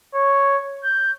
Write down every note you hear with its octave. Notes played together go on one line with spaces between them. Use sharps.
C#5
G6